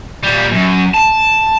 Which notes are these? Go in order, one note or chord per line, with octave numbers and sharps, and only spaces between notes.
A#2 G3
F#2
A5